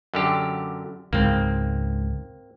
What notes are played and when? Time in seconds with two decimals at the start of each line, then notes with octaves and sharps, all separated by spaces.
0.14 F#2 D3 G4
1.13 C#2 G#2 A#3 C4